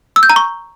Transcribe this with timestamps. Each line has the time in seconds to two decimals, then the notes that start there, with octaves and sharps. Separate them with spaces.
0.16 E6
0.23 G6
0.30 A#5
0.36 C#6